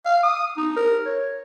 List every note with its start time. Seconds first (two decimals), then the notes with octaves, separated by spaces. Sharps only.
0.06 F5
0.23 D#6
0.57 D#4
0.76 A#4
1.06 C#5